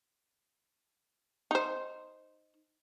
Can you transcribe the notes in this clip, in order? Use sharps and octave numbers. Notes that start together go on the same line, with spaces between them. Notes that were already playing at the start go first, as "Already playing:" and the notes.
D#4 C5